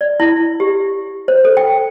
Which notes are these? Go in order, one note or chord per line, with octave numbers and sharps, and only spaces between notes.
D5
E4
G4
C5
A4
G5